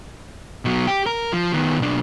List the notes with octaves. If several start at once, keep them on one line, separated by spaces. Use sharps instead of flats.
B2 F#3
G4
A#4
F3
D#3 B3
B1 D4